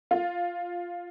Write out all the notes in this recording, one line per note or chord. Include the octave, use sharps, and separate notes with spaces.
F4